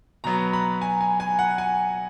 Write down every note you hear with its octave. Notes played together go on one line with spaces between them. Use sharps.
B2 F#3 B3 A#5
B5
G#5
G#5
G#5
F#5
G#5